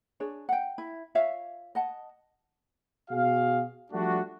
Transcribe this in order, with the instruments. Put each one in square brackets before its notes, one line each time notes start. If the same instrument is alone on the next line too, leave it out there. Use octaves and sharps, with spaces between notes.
[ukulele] D4 G#4 C#5
F#5 G5
E4
F4 C#5 E5 F5
D#5 F#5 A5
[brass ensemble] B2 F#4 G#4 F5
F3 G3 A3 D4 F#4